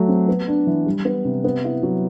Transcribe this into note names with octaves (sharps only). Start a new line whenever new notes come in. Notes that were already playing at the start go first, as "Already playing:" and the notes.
Already playing: F#3 A3
C4
B3
D4
E3
G3
B3
C3
B3
E4
F#3